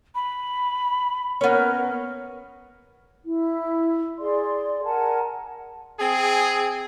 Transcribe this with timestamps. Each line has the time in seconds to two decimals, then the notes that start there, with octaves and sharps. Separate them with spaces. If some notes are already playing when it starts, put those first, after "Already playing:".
0.15 B5
1.41 B3 C#4 A#4
3.24 E4
4.18 G#4 D5 C6
4.84 A#4 F#5 G#5 A5
5.99 C4 G#4